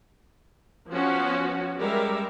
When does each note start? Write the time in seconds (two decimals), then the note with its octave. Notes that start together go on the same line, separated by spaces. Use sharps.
0.89 F3 B3 C#4 F#4
1.79 G3 G#3 A#4 E5